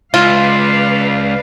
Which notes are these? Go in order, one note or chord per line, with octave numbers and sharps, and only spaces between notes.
C#2 F4 B4 D5 F5